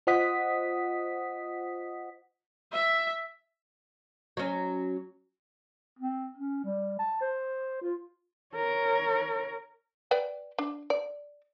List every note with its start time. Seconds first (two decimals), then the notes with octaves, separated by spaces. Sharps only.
0.07 F4 C5 D#5 F#5 D#6 B6
2.72 E5
4.37 F#3 C#4
5.99 C4
6.37 C#4
6.64 G3
6.99 A5
7.21 C5
7.81 F4
8.56 A#4 C#5
10.11 B4 D5 G5
10.59 D4
10.90 D5